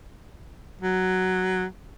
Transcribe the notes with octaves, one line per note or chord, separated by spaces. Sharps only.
F#3